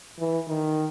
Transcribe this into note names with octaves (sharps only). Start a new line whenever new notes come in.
E3
D#3